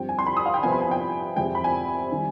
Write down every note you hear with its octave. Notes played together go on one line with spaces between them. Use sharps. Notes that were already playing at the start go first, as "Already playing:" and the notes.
Already playing: G2 F3 C4 G5
G#5
C6
B5
D#6
F5
G5
C3 F3 B3 G#5
B5
G#5
G5
F2 C3 F3 G#3 G5
B5
G#5
D#3 G3